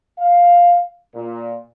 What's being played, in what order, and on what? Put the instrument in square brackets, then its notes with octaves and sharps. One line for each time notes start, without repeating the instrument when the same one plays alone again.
[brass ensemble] F5
A#2